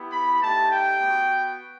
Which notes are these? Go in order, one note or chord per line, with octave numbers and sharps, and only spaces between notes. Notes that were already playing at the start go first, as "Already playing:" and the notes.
Already playing: B3 E4 G4
B5
A3 D#4 G4 A5
G5
B3 F#4